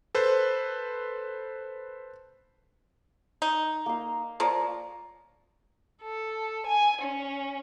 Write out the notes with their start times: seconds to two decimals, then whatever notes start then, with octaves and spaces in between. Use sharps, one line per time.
0.15 A4 B4 C5
3.42 D#4
3.86 A#3 F5
4.40 F3 A#4 C#5 D5
6.02 A4
6.67 G#5
7.02 C#4